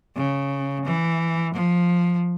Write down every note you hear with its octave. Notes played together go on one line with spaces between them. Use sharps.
C#3
E3
F3